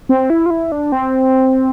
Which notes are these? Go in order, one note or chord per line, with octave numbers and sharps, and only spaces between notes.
C4
E4
F4
E4
D4
C4